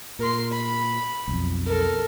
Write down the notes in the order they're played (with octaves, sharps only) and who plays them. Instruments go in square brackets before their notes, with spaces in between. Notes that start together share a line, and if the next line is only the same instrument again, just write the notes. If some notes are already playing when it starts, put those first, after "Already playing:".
[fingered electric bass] A#2 [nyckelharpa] A#4 C6
[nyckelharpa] B5
[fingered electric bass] B1 F2
[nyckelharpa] A4 A#4